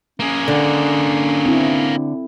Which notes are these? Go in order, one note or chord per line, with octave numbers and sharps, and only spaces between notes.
A#3 C#4 G#4
D3
C4 E4